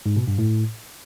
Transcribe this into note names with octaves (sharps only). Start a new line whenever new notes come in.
G#2
B2
G2
A2